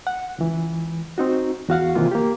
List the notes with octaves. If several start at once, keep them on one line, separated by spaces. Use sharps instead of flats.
F#5
C#2 E3
C4 D#4 F#4
E2 F#4 F5 F#5
C3 D#3 E3 A#3 F4
A#3 G4